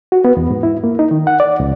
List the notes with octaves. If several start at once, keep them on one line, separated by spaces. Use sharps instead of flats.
F#4
B3
E2
G#2
E4
A#3
D#4
D#3
F#5
D5
C#2